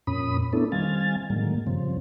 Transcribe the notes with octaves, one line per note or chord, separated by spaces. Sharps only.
F2 A#2 C#4 B5 D#6
A#3 B3 C#4 D4 E4 A4
D#3 G3 C4 F5 G#5 A6
A2 D3 D#3 F#3 G#3 A#3
G2 C#3 F3 C4